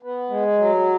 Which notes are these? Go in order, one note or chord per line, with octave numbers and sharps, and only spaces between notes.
B3
G#3
F#3